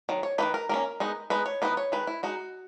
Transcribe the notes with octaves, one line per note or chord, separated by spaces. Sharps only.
D#3 F#3
C#5
D#3 A#3 D#4 B4
A#4
D#3 A#3 C#4 A#4
G#3 B3 D#4
G#3 B3 D#4 B4
C#5
E3 B3 D#4 B4
C#5
D#3 G#3 D#4 B4
E4
G#3 D#4 F#4